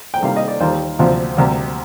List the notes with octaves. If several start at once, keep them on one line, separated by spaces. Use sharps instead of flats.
G5
C3 D#3 G3 A#3 F5
D#5
D5
D#2 D#3 G3 A#3 F4 C5
D2 C3 F3 C4 F4
D2 C3 G3 A#3